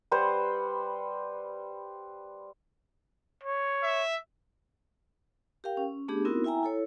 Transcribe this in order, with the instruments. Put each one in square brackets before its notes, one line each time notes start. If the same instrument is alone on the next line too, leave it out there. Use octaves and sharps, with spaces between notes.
[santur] G3 B4 C5 F#5
[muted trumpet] C#5
[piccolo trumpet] E5
[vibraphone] G4 A#4 F5 G5
C#4
A3 B3 D4 G4 G#4
B3 C4 D#4 E4 F#4 A#4
E4 E5 G5 G#5 A#5
E4 A4 C#5